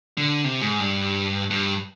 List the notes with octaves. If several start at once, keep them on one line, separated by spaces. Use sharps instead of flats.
D3
C3
G#2
G2
G2